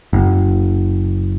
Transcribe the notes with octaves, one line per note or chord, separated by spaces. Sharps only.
F#1